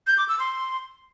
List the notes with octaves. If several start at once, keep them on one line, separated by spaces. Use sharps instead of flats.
G6
D6
E6
C6